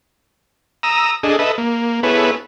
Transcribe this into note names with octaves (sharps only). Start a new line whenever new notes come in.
A#5 D#6 E6
D4 G#4 A4 D#5
A4 B4 D#5 E5
A#3
B3 E4 G#4 A4 B4 C#5